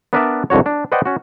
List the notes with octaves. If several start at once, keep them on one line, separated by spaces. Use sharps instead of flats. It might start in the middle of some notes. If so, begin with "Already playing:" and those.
B3 D4 A#4 B4 D5 E5
C2 F2 D3 F#4 C#5
D4
B4 C5 D5 D#5 F#5 G5
C#4 F#4